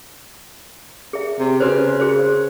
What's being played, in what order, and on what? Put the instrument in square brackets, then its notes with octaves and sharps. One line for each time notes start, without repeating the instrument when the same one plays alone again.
[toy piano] G#4 E5
[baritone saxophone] C3
[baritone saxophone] C#3 [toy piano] F#4 B4 C5
[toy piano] F#4 G#4 C5